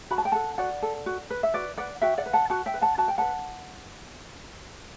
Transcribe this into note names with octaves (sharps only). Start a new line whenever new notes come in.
F#4 B5
A5
G5
A4 F#5 A5
F#4 D5 F#5
A4
F#4
B4
E5
F#4 B4 D5
B4 D5 F#5
F#4 E5 G5
D5 F#5
B4
F#5 A5
F#4 F#5 A5
E5 G5
B4
F#5 A5
F#4 A5
G5
B4 F#5 A5